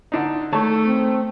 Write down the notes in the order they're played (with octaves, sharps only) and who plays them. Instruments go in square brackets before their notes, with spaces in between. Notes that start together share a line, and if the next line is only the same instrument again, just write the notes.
[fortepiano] D3 D4 D#4
[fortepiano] D#3 C#5 A5 [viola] A3
[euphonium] C4